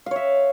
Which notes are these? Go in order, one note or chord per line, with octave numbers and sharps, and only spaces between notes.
C#5 E5 F5